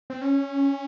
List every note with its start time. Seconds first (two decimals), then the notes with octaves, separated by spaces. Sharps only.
0.10 C4
0.21 C#4